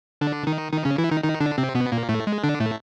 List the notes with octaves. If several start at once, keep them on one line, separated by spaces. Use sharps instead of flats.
D3 D4
D#3 D#4
D#3 D#4
C#3 C#4
E3 E4
D#3 D#4
D#3 D#4
D3 D4
C3 C4
B2 B3
A#2 A#3
A2 A3
G#3
D3 D4
A2 A3